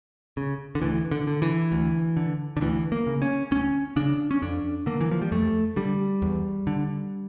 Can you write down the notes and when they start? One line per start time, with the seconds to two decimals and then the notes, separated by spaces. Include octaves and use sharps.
0.37 C#3
0.75 D3
0.82 D2 E3
1.11 D3
1.27 D3
1.42 E3
1.72 D2
2.17 D3
2.57 D3
2.61 D2 E3
2.92 A#3
3.07 C#3
3.22 C#4
3.51 D2 C#4
3.96 C#3 D4
4.31 C#4
4.42 F2 D4
4.86 D3 A#3
5.01 E3
5.11 F3
5.21 G3
5.32 F2 A3
5.76 D3 G3
6.22 E2
6.67 D3